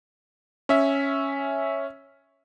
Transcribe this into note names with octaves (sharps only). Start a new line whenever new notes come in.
C#4 E5